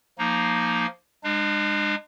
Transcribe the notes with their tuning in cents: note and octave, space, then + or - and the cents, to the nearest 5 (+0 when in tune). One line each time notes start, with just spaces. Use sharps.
F3 +0 A#3 +0 D#4 +0
G#3 -30 D4 +40